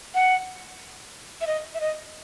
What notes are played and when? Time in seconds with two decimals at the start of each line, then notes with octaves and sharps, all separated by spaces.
0.15 F#5
1.41 E5
1.47 D#5
1.74 E5
1.81 D#5